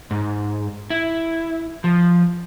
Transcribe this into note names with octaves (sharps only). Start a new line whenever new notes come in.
G#2
E4
F3